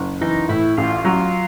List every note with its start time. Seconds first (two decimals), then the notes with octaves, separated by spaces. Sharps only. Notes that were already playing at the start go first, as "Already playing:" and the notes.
Already playing: F#1
0.21 E3 D#4
0.49 A2 E4
0.77 A1 F4
1.05 F#3 F4